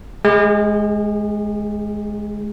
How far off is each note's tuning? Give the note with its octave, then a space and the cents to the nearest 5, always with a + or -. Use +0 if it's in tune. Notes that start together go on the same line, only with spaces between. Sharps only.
G#3 +15 G#4 -35